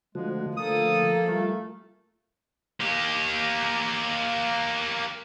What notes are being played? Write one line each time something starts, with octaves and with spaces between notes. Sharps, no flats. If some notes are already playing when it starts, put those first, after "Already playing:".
D3 F3 G#3 A3 F#4
D3 A3 A#3 A4 D#6
G3 A3 F4
A#3 G4